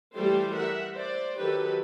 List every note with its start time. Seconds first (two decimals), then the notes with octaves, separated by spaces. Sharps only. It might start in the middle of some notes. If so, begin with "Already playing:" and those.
0.15 E3 G3 A3 G4 A4 C5
0.54 A#4 E5 F#5
0.95 C5 D5
1.39 D#3 F#3 G4 A4 B4